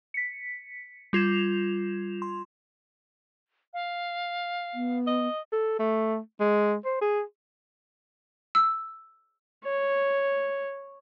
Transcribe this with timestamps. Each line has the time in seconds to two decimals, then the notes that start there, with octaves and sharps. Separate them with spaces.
0.14 B6 C#7
1.13 G3 F4 G#6 E7 F7
2.22 C6
3.74 F5
4.74 B3
5.07 D#5
5.52 A4
5.79 A3
6.40 G#3
6.85 C5
7.01 G#4
8.55 E6
9.65 C#5